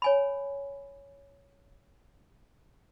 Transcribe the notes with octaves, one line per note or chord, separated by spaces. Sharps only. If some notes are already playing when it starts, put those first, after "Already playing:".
C#5 G#5 B5